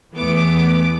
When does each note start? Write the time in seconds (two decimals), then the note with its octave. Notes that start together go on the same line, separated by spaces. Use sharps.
0.15 E2 E3 A3 B3 D6